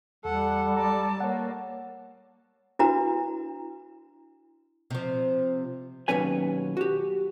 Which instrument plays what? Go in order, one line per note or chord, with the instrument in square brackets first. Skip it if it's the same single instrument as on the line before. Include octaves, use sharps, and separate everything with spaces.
[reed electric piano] E2 [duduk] G3 [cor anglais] A4 [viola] F#5
[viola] D5 A5 [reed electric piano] A#5
[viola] A#3 [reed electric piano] C#5 F#5
[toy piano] D4 E4 F#4 B4 A#5
[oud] C3 F3
[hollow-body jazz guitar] D#2 B2 F#3 C#4 B4 G#5
F#4 G4